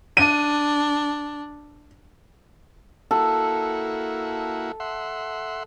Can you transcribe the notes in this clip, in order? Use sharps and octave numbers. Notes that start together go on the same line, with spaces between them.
D4 D#7
A#3 E4 F#4 A4
E5 F#5 C6